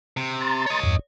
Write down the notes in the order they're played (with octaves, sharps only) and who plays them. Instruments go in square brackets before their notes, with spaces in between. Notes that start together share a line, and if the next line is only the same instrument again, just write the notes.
[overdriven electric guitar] C3
[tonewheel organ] A#5 C6 A6
[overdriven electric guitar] C#5 D#5
[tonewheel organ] E2 G2